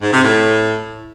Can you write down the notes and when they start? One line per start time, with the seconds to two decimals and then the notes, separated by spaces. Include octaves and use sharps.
0.02 G#2
0.13 C3
0.24 A2